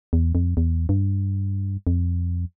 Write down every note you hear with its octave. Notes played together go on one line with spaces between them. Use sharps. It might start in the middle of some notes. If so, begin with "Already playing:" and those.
E2
F2
E2
G2
F2